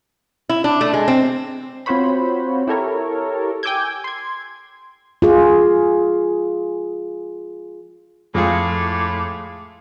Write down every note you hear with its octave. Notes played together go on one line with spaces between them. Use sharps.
E4
D4
A3
G#3
C4
C4 F4 F#4 C5 C#5 B5
E4 G4 A4 A#4 C#5
G5 G#5 D6 E6 G6 G#6
C6 G#6
F4 G#4
F2 A2 G#3 F4 G#4 D6